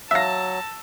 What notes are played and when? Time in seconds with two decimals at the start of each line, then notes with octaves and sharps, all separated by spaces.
0.11 F#3 E5 F5 A5 E6 A#6